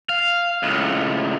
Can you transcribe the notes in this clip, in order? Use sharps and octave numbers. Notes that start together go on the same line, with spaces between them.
F5
C#2 A2